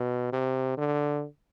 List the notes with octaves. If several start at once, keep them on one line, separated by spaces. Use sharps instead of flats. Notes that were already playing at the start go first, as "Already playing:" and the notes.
Already playing: B2
C3
D3